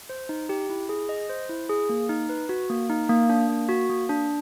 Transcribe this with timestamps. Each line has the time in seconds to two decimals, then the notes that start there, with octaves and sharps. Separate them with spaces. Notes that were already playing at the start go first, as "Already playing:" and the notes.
0.09 C5
0.29 D#4
0.49 G4
0.70 E4
0.89 G#4
1.09 D#5
1.29 C5
1.50 E4
1.70 G#4
1.89 A#3
2.09 D#4
2.29 B4
2.49 F#4
2.70 A#3
2.90 D#4
3.09 A#3
3.29 D4
3.49 A#3
3.69 F#4
3.89 A#3
4.09 D4